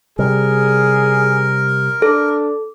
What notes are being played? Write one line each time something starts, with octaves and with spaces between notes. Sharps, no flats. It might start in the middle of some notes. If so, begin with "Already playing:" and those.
C3 G3 G#4 A#4
D4 A4